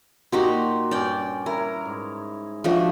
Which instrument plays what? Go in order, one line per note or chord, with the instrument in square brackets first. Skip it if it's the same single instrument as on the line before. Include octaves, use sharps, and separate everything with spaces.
[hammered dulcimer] A#2 C6 [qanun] D#4 F#4 G4
[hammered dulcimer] G2 C#4 [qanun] D5 G5
[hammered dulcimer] E4 A#5 [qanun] A#4
[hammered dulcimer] G#2
[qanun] F3 A3 D4 [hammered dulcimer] F#4 D#5